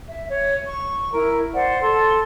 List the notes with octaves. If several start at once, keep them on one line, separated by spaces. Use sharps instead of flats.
E5
C#5
C#6
E4 A#4
C5 D5 F#5
A4 C6